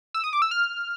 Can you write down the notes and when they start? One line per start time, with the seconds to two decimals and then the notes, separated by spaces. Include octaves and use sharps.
0.14 E6
0.24 D#6
0.33 D6
0.42 E6
0.51 F6